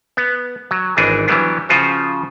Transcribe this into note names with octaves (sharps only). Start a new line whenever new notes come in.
B3
F#3
G#1 E3 D4 D#4 G#4
E3 F#3 G3 B3 D4
C#3 F3 F4 F#4 C5